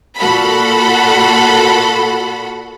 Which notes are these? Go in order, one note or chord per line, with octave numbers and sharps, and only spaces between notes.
A#2 F#4 A4 F#5 B5